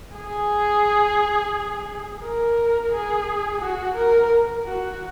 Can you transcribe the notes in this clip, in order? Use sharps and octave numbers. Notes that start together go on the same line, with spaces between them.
G#4
A#4
G#4
F#4
A#4
F#4